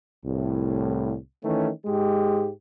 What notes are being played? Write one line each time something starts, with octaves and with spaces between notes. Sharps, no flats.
C2 A2
D#3 E3 A3 C#4
G#2 G#3 G4